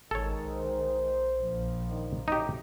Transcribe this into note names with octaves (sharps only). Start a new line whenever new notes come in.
G#1 D#3 G#3 A4 C#5
B1 C5
A#1 F3
D#3
A2 F#3 D#4 G4